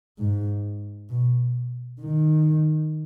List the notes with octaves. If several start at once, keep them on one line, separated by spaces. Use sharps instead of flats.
G#2
B2
D#3